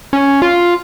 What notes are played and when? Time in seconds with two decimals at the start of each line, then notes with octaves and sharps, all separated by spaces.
0.13 C#4
0.42 F4